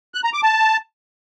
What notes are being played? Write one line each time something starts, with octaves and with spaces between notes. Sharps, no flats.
F#6
A#5
D6
A5